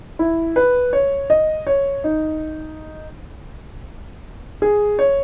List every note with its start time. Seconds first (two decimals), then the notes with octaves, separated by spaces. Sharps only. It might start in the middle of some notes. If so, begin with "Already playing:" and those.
0.19 E4
0.56 B4
0.93 C#5
1.30 D#5
1.67 C#5
2.04 D#4
4.62 G#4
4.99 C#5